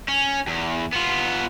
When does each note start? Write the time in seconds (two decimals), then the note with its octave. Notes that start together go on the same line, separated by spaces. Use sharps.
0.08 C#4
0.47 E2
0.93 B3 F4